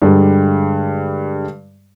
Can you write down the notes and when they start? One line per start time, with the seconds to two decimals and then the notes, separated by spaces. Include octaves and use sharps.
0.02 G2 D3 G3 G#3